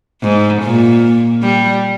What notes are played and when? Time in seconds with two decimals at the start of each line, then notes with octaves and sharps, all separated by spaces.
0.23 G#2
0.63 A#2
1.42 G3